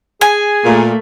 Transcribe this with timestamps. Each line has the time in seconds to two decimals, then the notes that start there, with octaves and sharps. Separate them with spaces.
0.21 G#4 G#5
0.64 A#2 A3 A#3